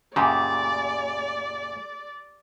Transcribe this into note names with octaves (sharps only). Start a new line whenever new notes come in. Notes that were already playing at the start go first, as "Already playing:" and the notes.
F#2 A#2 C#3 G4 D5